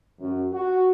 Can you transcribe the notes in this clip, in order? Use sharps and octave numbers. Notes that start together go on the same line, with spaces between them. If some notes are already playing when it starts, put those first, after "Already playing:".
F#2
F#4